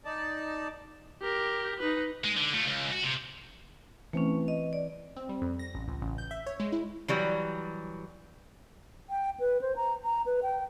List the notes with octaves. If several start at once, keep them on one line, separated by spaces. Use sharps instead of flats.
D#4 D5 A5
G4 A#4
D#4 B4
G#3
D3
A3 F4
C#2
F#4
C3
E3 A3 C4 C#4
D#5
D5
C4
G3
F2
A#6
A1
C#2
A1
G6
E5
C#5
G#3
E4
E3 F#3 G3
G5
B4
C5
A#5
A#5
B4
G5